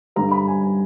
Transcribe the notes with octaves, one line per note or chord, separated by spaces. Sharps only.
G2 D3 G3 A#5
B5
G#5
G#5